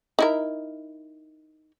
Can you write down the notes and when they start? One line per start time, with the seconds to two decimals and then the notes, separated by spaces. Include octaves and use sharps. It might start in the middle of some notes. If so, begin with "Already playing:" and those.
0.19 D#4 E4 A#4